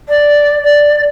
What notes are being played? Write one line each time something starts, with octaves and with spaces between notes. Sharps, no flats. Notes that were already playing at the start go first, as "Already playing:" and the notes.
D5
D5